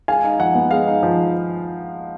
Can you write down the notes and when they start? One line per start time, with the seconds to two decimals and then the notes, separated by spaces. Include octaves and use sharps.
0.08 G#3 F5 G#5
0.24 D#4
0.39 F3 F#5
0.55 B3
0.71 G#3 F5
0.87 D#4
1.03 F3